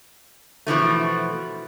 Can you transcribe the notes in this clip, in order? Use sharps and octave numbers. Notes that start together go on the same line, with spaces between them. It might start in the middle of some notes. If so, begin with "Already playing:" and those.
B2 E3 F3 A3